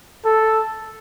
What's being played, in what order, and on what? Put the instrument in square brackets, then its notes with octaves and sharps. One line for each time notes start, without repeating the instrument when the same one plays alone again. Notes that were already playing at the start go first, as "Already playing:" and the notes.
[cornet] A4